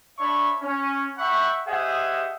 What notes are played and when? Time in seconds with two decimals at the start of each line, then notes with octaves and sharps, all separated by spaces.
0.19 D4 C#5 D5 E5 B5 C#6
0.61 C#4
1.18 E5 F#5 G5 B5 C#6
1.67 G4 G#4 C5 D#5 E5 F#5